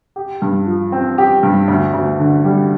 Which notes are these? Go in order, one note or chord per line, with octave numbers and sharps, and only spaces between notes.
G4
G2
F3
C4
G4
G2
D2
D2
D3
G3